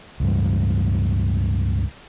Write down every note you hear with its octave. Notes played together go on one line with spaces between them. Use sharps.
C#2 G2